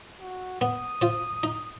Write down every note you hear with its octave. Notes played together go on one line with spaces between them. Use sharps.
F#4
B3 D#6
F4 C5
D#4